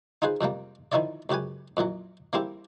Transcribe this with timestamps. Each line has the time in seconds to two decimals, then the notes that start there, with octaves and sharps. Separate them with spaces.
0.22 D#4 F4 G#4 B4 C5
0.41 F2 C3 G3 A#3
0.92 D#3 F3 D#4 E4 C#5 D5
1.29 C#2 F#2 G4 B4 G#5
1.77 F2 A#2 E3 F#3
2.33 E3 G3 A#3 C4 E4 G4